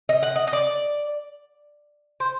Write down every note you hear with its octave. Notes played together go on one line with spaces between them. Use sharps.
D#5
F#5
D#5
D#5
D5
C5